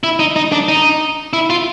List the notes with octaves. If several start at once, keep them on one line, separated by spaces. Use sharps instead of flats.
E4
D#4
D#4
D4
D#4
E4
F4